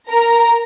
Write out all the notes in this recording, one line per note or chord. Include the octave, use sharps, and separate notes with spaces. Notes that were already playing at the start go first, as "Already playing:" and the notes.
A#4 A#5